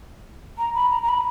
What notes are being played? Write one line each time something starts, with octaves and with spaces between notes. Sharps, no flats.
A#5
B5
A#5
A#5
B5